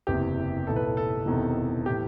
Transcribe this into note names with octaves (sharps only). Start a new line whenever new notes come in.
F#1 E2 C3 E3 G4
B1 A2 E3 A4
B4
A4
A4
E1 E2 C3 D#3
A2 E3 G4